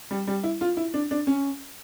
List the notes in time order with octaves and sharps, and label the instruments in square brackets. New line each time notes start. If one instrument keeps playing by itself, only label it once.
[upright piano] G3
G3
E4
F4
E4
D4
D4
C#4